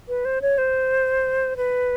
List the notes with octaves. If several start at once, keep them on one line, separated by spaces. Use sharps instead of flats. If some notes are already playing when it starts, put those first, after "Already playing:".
B4
C5
C#5
C5
B4